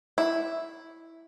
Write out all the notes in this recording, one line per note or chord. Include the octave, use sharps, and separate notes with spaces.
E4